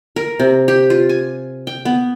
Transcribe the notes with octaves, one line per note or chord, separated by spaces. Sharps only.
A#4
C3
G4
F4
G#5
G5
B3